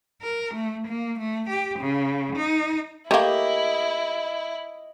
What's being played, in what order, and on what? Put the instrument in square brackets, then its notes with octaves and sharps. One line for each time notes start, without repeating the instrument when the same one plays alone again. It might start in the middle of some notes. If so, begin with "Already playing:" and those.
[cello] A#4
A3
A#3
A3
G4
C#3
D#4
[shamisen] A3 A#3 [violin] E4 [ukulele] G4 [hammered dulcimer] D#5